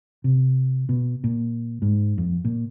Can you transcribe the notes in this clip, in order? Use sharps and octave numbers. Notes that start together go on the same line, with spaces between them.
C3
B2
A#2
G#2
F2
A#2